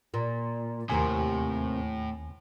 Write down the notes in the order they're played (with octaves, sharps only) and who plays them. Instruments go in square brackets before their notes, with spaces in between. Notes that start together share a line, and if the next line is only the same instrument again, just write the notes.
[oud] A#2
[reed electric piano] D#2 G#5 [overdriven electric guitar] A2 [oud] C3 D#3 A#3